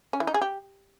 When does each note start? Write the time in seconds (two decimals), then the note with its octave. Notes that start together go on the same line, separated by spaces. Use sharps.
0.13 C#4
0.20 E3
0.27 D#4
0.34 G#4
0.41 G4